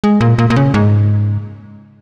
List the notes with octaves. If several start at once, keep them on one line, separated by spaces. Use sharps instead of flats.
G#3
A#2
A#2
A#2
C#3
G#2